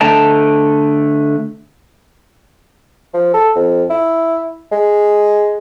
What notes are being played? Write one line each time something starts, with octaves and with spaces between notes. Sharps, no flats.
D3 A3 D#5 G5 A5 A#5
F3
A4
F2
E4
G#3